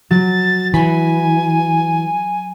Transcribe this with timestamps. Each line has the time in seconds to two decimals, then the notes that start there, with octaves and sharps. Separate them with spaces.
0.11 F#3 A6
0.74 E3 G#5 B5